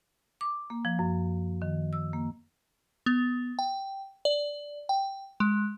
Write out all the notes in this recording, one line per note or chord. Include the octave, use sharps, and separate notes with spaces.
D6
A#3
F3
F#2
D#3
E6
A#3
B3
G5
D5
G5
G#3